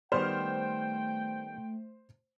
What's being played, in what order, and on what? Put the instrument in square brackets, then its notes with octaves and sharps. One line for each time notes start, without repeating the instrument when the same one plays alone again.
[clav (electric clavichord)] D#3 G3 B3 [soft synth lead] A3 [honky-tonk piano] C5 C6 F6 [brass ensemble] G5